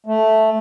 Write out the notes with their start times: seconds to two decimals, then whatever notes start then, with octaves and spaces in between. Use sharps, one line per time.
0.06 A3